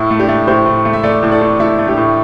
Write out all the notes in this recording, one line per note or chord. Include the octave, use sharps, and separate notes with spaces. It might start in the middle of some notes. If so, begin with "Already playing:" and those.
Already playing: A2 E4
A3
D4 G4
A3
A2 G4 C5
A2
A3
E5
A3 A4 D5
A2
A4 D5
A2
A3 E4 A4
A3
D4 G4
A2